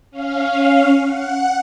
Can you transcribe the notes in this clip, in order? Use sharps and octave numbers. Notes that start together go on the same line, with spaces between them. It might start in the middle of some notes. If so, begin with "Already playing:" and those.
C#4 F5
F#5